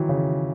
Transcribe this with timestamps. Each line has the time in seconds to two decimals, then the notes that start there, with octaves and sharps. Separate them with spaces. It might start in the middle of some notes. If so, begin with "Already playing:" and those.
Already playing: D#3 E3 F#3
0.09 C#3